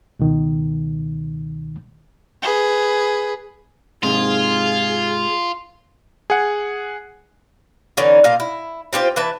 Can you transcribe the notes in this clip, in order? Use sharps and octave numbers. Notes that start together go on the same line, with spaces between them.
C#2 B2 D#3
G#4 B4
G#2 C3 F4 G#4
G#4 F#5
D3 E3 C#4 D#4
A#2 D#5 F5
E4
C4 F4 G4 C5
E3 B4 E5 A5